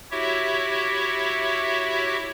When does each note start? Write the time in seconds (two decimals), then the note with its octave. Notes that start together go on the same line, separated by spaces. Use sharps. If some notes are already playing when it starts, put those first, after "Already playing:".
0.11 E4 F#4 G4 C#5 E5